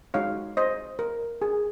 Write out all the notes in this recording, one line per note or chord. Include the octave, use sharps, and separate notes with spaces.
G#3 D#4 F#4 C#5 F5
C5 D#5
A#4
G#4